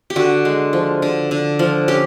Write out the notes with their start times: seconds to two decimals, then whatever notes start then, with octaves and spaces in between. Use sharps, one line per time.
0.10 G4
0.16 D3 F#4
0.45 G#3
0.73 F3
1.02 D3
1.31 D3
1.59 F3
1.88 C#4 G4